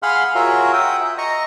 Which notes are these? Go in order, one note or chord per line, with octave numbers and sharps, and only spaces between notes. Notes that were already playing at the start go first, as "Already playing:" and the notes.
G#4 F5 F#5 B5 C6 F6
F4 F#4 G#4 A#4 C#5 E5
E5 F#5 G5 D#6
E5
D#5 A#5 C#6